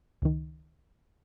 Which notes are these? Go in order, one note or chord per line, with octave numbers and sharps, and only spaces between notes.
C#2 D#3